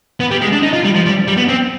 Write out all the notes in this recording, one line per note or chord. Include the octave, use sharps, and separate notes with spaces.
B3
G3
G#3
D4
D#4
F4
G3
F3
G3
G3
B3
C4